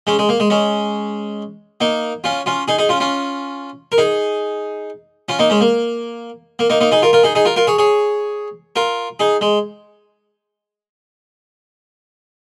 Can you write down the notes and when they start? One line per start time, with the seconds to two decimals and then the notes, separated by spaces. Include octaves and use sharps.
0.07 G#3 C#4
0.19 G#3
0.29 A#3
0.40 G#3
0.50 G#3 C#4
1.81 A#3 D#4
2.24 C#4 F4
2.46 C#4 F4
2.68 D#4 G#4
2.78 D#4 G#4
2.89 C#4 F4
3.00 C#4 F4
3.92 A#4
3.98 D#4 G#4
5.29 C#4 F4
5.39 A#3 D#4
5.50 G#3 C#4
5.61 A#3
6.59 A#3
6.70 A#3 D#4
6.81 A#3 D#4
6.91 D#4 G#4
7.02 F4 A#4
7.13 F4 A#4
7.23 D#4 G#4
7.35 D#4 G#4
7.45 F4 A#4
7.56 F4 A#4
7.67 G#4 C#5
7.78 G#4 C#5
8.76 F4 A#4
9.20 D#4 G#4
9.41 G#3